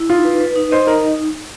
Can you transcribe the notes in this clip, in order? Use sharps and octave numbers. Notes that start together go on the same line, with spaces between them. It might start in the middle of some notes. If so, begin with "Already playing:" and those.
Already playing: E4
D#4 F4
B4
B4
D#4
C5 D#5
D#4 A#4